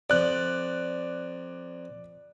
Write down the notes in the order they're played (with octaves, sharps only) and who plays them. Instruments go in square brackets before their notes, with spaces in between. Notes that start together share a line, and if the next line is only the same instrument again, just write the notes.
[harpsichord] F2 [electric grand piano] D5 F#6